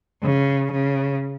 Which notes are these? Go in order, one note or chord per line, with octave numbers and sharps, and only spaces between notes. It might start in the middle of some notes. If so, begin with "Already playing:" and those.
C#3
C#3